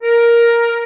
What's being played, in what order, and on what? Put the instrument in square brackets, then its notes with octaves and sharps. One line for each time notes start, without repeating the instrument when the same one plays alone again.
[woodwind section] A#4